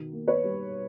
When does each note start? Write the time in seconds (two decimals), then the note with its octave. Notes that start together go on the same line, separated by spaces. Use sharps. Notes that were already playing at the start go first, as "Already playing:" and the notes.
Already playing: B2 D#3
0.13 A#3
0.27 B4 C#5
0.44 G3